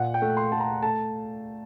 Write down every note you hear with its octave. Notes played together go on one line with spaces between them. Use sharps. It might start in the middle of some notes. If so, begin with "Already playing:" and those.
Already playing: A#2 F#5
G5
A3
C6
A3 A5
A#5
A3 A5